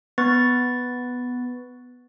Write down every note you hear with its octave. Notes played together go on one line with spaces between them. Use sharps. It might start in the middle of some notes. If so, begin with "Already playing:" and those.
B3 B4 C#6 A6